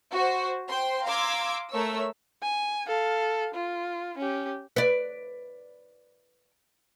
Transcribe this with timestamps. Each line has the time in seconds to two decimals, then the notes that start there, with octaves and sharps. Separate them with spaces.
0.12 F#4 C5
0.68 C5 G5 C6
1.05 F5 A#5 C6 D6 E6 G#6
1.72 A3 A#4 C#5 E6
2.42 G#5
2.87 A4 F5
3.55 F4
4.18 C#4 G4
4.76 B4 D5